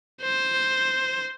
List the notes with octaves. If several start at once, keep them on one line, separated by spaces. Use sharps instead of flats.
C5